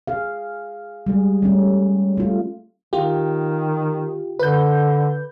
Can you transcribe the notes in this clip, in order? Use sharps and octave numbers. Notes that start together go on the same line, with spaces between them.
G#4 F5
G3 G#3 G#4
G3 A3 C#4
A3 F4
D#3 F4 G4
D3 B4 G6